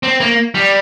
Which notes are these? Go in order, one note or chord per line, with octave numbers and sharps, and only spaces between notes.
C4
A#3
G3